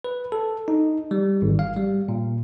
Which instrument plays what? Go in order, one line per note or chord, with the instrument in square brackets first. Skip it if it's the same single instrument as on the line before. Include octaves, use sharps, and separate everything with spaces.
[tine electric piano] B4
A4
D#4
G3
G#1
F5
G3
A#2